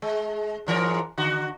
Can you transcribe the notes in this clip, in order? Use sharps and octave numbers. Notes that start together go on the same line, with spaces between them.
G#3
G#2 E3 A#4
D3 F#4